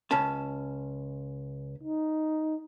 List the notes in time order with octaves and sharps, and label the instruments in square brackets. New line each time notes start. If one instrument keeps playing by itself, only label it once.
[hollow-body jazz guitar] C#2 C#4 A5
[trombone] D#4